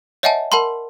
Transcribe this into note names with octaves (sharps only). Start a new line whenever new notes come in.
C#5 D#5 E5 F#5 G#5 A5
A#4 F#5 A5 B5 C6